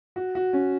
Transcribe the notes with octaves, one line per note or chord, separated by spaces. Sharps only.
F#4
F#4
C#4